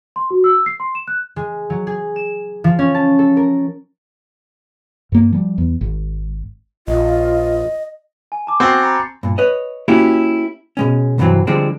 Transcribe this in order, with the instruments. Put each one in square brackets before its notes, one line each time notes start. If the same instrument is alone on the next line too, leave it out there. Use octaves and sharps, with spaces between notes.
[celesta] C6
F#4
E6
C7
C6
E7
F#6
[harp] G#3
F#3
G#4
E7
F3
C#4
A5
A4
A#4
[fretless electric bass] G2 A#3
F3 G3
E2
G#1
[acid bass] A#1 [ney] F4 [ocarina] D#5
[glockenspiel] G#5
A5 D6
[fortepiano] C4 F#4 [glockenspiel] C6 A6 C7
[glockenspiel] A#5 B5 C#7
[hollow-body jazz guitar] G2 A#2
B4 C#5 D#5
A#3 C#4 E4 F#4 G4
B2 G#3 C#4
C2 G2 C3 E3 F#3 C4
D3 F3 G3 G#3 C4